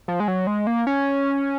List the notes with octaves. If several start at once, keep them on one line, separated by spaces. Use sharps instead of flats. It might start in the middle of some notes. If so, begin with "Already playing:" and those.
F3
G#3
F#3
G#3
A#3
C#4